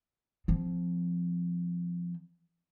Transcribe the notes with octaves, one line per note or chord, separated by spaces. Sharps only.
F3 C4